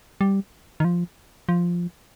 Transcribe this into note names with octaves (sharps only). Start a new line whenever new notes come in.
G3
D#3
F3
F3